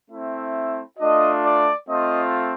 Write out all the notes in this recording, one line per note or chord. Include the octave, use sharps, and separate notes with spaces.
A3 C4 E4 E5
A3 D4 F4 D#5
D5
A3 C4 F4 D#5